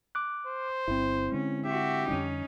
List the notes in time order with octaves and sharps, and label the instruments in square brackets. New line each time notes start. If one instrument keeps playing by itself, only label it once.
[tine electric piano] D6 F#6
[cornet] C5
[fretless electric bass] G1 G2 [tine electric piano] C4 E4
[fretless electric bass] D3 G#3 [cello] C#4
[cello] F#4 E5 [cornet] G4
[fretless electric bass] F2 D3 G3 [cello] C#4 D#4